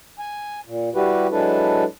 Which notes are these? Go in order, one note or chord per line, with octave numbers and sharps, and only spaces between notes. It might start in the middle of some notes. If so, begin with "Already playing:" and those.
G#5
A#2
G3 E4 F#4 G4 B4
F#3 G#3 D4 E4 A4 B4